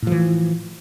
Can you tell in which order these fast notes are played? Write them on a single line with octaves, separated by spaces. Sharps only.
A2 F3 E3